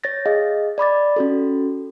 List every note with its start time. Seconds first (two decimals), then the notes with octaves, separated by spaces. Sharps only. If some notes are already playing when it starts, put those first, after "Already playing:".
0.04 C#5 A6 A#6
0.26 G#4 D#5 F5
0.78 D5 B5 D6 A6
1.16 C#4 F#4 A4